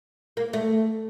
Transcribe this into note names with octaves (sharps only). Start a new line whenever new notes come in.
A#3
A3